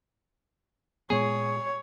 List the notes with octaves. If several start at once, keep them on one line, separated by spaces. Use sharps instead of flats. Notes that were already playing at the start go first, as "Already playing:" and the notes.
A#2 G#3 B3 G#4 C#5